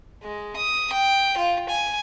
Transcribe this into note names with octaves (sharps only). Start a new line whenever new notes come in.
G#3
D#6
G5
F4
G#5